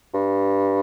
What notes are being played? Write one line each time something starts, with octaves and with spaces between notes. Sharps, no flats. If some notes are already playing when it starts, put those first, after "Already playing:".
G2